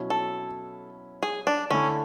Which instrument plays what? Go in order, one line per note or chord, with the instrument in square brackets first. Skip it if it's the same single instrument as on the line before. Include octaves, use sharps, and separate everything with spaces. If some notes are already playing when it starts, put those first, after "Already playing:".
Already playing: [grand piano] B2 F#3 C#4 E4
[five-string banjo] A4
G#4
D4
[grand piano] D3 A3 E4 [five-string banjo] C#4